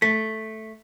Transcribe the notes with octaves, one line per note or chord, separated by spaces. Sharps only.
A3 B6